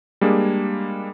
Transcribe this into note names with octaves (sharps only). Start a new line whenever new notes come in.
G3 G#3 A#3 D4 G#4